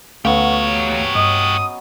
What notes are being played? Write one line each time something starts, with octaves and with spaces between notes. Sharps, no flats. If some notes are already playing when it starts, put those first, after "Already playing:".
D2 F#3 A3 B3 C#4 G4 C#5 F5
G2 D#5 D#6